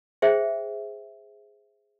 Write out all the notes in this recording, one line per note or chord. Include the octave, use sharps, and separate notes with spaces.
G#4 C5 E5 G5